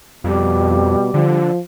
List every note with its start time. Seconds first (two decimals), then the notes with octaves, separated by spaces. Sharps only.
0.24 F2 B2 G3
1.14 D3 F3